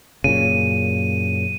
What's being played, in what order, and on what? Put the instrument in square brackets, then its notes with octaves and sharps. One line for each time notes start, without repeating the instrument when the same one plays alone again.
[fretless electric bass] F#2 A#2 C#3 [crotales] D#7